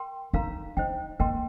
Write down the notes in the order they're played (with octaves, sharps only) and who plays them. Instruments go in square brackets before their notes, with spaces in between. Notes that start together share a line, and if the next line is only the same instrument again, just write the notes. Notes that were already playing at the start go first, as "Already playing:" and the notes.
Already playing: [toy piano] A#4 G5 C6
[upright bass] D#4 [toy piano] A#4 F5 A#5
[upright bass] D#4 [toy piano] C5 D#5 G5
[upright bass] A#3 [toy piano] A#4 D#5 G5 C6